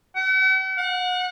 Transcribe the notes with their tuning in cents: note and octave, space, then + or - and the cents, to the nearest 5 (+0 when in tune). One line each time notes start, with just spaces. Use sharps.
F#5 +45
F#5 -30